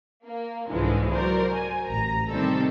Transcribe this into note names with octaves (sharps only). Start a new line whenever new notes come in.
A#3
C2 G#2 D3 E3 F3 G#3
F#3 F#4 A#4 C5 D5
G#5
A1 A#5
C3 D#3 G3 C4 A4